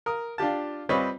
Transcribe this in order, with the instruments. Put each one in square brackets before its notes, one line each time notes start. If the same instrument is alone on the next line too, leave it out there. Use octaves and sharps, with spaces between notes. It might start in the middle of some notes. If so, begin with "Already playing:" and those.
[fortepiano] A#4 D#6
D4 F4 G4 A5
G3 C4 F4 B4 C#5 D#5